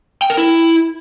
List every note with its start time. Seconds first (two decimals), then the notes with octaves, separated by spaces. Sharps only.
0.22 G5
0.30 A#4
0.37 E4